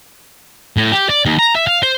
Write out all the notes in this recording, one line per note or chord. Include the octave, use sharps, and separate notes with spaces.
A2
G4
D5
D#2
A#5
E5
F5
C5